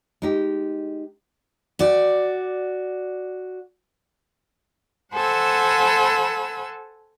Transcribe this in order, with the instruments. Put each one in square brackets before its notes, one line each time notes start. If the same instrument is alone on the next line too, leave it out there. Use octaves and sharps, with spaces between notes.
[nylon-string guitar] G#3 D#4 G4
[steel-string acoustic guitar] F#4 D5
[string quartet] A4 C5 F#5 G#5 B5 E6